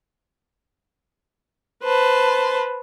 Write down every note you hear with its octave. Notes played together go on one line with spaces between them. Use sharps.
B4 C5 A5